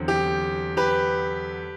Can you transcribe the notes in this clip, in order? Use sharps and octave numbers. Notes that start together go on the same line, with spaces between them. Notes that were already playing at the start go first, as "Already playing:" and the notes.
Already playing: E2 D3 F#3 C4
G4
G4 B4